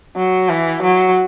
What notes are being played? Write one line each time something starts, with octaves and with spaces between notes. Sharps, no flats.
F#3
E3
F#3